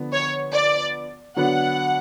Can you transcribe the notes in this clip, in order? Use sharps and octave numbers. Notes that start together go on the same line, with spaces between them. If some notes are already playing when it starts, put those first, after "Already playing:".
Already playing: D3 F3 B3
C#5
D5
D3 F#3 B3 D4 F#5